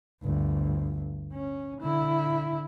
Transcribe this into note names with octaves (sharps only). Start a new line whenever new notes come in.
G1 D2
C#4
D3 E4